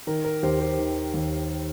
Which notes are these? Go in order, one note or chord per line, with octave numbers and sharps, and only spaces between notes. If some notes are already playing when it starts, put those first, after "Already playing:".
D#3 A#4
A#4
D#2 G4 C5
G4 C5
D#3
D#2